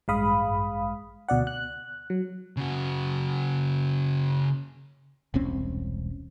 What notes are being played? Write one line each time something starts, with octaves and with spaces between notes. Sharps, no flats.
A1 G2 G#3 F5 B5 D#6
D2 B2 D5 F#5
F#6
F#3
C#3 F#4
E1 C2 C4 C#4